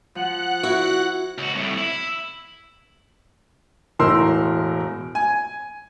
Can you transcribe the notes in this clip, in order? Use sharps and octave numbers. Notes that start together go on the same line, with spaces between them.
F3 F#5 F#6
E4 F#4
C#2 F#4
C2 A2
E4
E1 A2 A#4 C6 E6
G#5